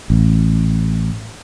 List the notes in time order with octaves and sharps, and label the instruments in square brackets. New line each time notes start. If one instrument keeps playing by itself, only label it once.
[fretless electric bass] A1